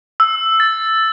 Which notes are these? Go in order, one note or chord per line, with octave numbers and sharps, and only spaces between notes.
E6
A6